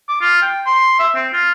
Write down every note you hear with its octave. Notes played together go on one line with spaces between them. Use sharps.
D6
F4
G5
C6
E5
C4
F4